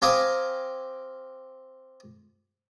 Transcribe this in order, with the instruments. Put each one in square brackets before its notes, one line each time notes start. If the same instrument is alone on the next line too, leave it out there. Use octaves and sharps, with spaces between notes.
[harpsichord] C4 G4 F5 G#5 A#5 D#6